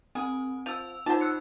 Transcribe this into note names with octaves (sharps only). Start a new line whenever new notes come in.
C4 G#4
F3 E6 F7
D#4 F4 C5 F#5 A5
E6 F#6 C#7